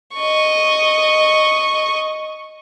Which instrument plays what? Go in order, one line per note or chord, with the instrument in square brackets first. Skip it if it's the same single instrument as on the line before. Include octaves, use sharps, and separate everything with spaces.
[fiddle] D#5 C#6